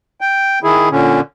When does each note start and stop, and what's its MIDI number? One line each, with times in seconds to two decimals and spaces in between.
0.21 0.59 79
0.63 0.89 51
0.63 0.89 64
0.63 0.89 68
0.91 1.21 46
0.91 1.21 50
0.91 1.21 61